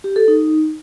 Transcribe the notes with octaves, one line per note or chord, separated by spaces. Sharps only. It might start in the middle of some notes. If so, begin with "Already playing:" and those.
G4
A4
D#4